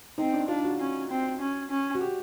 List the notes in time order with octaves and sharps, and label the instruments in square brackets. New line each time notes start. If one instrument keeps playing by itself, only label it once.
[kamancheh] C4 [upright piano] D#4
[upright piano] D4
[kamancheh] D4 [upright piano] F4
[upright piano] F#4
[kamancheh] C#4
C4
C#4
C#4
[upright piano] F#4
G4